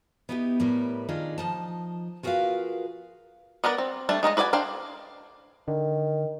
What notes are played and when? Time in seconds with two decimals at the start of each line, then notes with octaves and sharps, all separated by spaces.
0.29 B3 D#4 E4 F#4 G4
0.60 A2 G3 A#4 B4
1.09 D#3 D4 D#4 F4 G#4
1.38 F3 D#4 A5
2.23 F4 F#4 G#4 A#4 B4 F5
3.64 B3 A#4 B4 D5
3.78 C4
4.09 G3 A3 D4 A5
4.23 G#3 D#4 A#4 D#5
4.37 F#4 B4 D5 D#5 G#5
4.53 D4 C5 F5 G5
5.68 D3 D#3